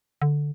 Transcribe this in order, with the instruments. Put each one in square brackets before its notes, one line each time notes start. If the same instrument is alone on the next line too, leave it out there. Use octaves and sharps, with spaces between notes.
[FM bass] D3